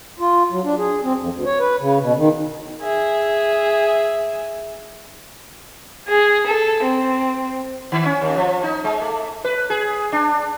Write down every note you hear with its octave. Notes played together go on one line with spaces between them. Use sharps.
F4
F#3
D4
G#4
C4
F2
D2
C#5
B4
C#3
B2
D#3
G#4 E5
G#4
A4
C4
D#3
C#4
D#2
F3
D#4
G#3
A3
B4
G#4
D4